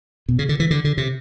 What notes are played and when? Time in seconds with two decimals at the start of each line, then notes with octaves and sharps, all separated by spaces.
0.29 B2
0.39 C#3
0.49 D3
0.60 E3
0.71 D3
0.84 D3
0.97 C3